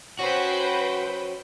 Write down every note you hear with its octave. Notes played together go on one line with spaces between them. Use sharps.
F#3 C#4 F#4 B4 C5 G5